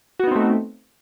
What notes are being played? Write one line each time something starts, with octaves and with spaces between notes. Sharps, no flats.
A3 B3 C4 D#4 F#4